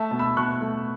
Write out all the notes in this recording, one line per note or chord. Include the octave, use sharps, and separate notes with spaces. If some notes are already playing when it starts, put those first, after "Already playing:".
Already playing: A3 E5 A5
B2
B5 E6
B2 C#6 F#6
A3